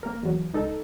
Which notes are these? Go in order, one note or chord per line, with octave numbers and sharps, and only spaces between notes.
A#3 A#4
E2 F#3
C#2 D#4 A4